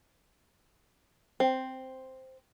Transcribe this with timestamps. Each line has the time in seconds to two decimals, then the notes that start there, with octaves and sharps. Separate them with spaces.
1.40 C4